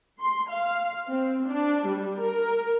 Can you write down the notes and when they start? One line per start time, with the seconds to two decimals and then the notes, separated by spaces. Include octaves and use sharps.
0.19 C6
0.50 F5
1.08 C4
1.48 D4
1.86 G3
2.21 A#4